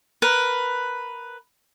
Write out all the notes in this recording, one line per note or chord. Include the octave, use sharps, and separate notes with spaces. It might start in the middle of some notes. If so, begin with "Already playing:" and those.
A#4 B4